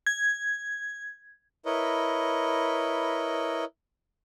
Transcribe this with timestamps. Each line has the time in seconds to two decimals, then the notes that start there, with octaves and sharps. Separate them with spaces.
0.07 G#6
1.66 E4 A#4 B4 C#5 D#5